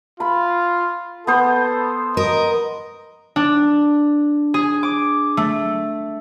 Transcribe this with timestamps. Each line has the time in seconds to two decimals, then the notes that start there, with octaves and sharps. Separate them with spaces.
0.20 F4 B5
1.27 B3 A4 C5
2.17 A#4 D#5
3.36 D4
4.54 G#4
4.83 D6
5.37 A3